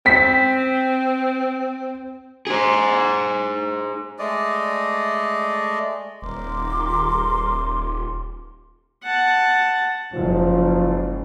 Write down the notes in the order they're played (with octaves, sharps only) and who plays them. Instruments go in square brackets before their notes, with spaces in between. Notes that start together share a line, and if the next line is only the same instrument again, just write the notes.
[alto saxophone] C4 [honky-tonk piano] B6
[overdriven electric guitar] G#4 C5
[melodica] G#3 A3 D5 D#5
[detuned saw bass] D#1 [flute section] A#4 C6 D6
[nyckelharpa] F#5 A5
[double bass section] F#1 G#2 [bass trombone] F3